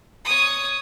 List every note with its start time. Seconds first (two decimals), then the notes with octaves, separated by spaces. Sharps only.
0.25 C#5 D#6